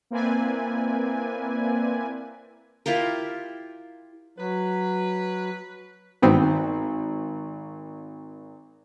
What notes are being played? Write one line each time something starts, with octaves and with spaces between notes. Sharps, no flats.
A#3 C4 E4 B4 D5 G#5
E4 F4 G4 A#4
F#3 B4
G#1 G2 B3 C4